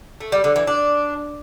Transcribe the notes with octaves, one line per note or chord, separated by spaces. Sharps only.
A3
G3
D3
E3
D4